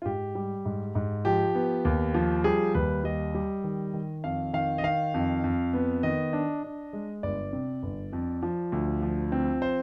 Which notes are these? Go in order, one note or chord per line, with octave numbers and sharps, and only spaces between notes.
F4
G#2 G4
G3
G#2
G#2
F3 G4
B3
D#2
F3
G3 G#4
D#2 B4
G3 D#5
G3
D#3
D#3
F2 F5
D#3 F5
D#5
D#3 F5
F2
F2
B3
D#3 D#5
D4
D4
G#3
G1 D5
C3
G1
F2
F3
D2
F3
C4
C5